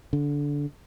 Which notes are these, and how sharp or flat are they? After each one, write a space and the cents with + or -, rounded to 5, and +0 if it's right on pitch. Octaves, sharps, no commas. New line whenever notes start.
D3 -20